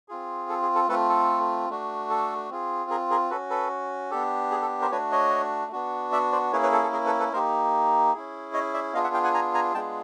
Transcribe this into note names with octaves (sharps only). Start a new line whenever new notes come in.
C4 F4 G#4
A4
G#4
A4
A3 C4 F4 A4 B4
A4
A3 D4 F#4
A4
C4 F4 G#4
G#4 A#4
G#4 A#4
C#4 F#4 A4 B4
A4 B4
B3 D4 G4 A4
G#4
A4
A#4 C5
A3 D4 F#4 B4 C#5
C#5 D#5
B3 D4 F#4
D5 E5
C5 D5
A#3 C#4 E4 G#4 B4 C#5
B4 C#5
A4
A4
G#4 A#4
A4 B4
A4 B4
A#3 D#4 G4 A#4 C5
C#4 E4 G#4
C#5 D#5
D5 E5
B3 D4 F4 G#4 D#5 F5
E5 F#5
F5 G5
F#5 G#5
G#5 A#5
G#5 A#5
G#3 B3 D4 F4 G#4 G5 A5